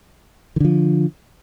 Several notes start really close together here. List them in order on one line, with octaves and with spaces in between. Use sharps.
D#3 D3 F3